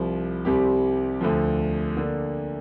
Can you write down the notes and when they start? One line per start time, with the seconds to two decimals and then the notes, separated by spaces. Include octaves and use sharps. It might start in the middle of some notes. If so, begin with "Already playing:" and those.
Already playing: C2 C3 F3
0.45 C2 C3 G3 C4 G4
1.21 D2 D3 F3
1.97 D3 A#3 D4